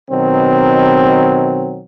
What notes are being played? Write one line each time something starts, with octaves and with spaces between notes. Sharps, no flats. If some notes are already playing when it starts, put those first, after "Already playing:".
B2 D#3 F#3 C4